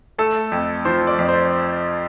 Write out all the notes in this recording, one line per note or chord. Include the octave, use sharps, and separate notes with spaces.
A3 A4
F2
F3 C5
D5
F2
C5